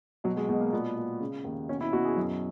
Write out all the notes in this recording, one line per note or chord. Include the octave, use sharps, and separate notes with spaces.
B2 F#3
G#3
B2 G#3
A#3
A#2 B3
A#2
C#3
D#2
B2 C#4
E4
B2 F#4
G#4
F#2